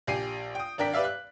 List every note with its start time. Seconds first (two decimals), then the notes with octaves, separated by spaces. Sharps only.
0.07 A#1 G4 G#5 C7 D#7
0.55 G5 D#6
0.78 G#1 D4 A#4 G5 B6
0.93 G4 B4 D5 E5 F5
1.05 F#6